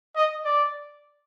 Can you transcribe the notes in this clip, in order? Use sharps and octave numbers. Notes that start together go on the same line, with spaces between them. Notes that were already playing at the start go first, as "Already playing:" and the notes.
D#5
D5